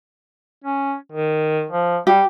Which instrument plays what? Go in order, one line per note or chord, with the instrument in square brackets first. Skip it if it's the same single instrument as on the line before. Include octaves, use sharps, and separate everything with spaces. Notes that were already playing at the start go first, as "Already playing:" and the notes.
[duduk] C#4
D#3
F3
[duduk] G3 [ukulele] G4